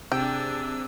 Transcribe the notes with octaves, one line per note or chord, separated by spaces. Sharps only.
C3 D4 G#4 G5 E6